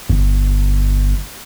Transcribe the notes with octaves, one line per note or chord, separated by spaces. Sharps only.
G1